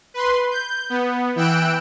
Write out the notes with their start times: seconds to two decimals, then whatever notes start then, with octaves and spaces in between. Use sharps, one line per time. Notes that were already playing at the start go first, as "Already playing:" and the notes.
0.14 B4 C6
0.51 G6
0.90 B3
1.36 E3 G5 E6 F#6 D7